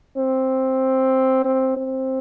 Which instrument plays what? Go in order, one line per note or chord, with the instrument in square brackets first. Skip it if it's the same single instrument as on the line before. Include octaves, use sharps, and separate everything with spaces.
[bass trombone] C4
C4
C4